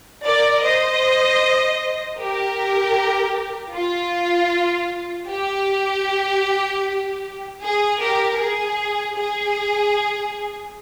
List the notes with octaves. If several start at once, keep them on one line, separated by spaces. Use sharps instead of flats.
A#4 D5
C5 D#5
G4 A#4
F4
G4
G#4
G4 A#4
G#4
G#4